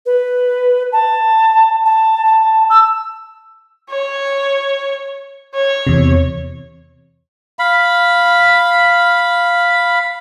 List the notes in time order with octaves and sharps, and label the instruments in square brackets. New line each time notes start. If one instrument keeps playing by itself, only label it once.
[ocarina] B4
A5
A5
A5
E6
[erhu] C#5
C#5
[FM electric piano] E2 C3
[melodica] F5 B5